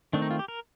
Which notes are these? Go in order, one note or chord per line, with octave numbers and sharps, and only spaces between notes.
D#3 A3 C4 D4
D#4
F4
G4
A#4